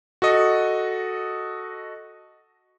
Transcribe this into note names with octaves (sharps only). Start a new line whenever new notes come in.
F#4 A4 D#5